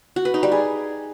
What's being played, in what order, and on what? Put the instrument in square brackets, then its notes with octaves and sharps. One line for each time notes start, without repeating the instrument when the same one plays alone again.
[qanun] F#4
B4
D#4
G3
G#4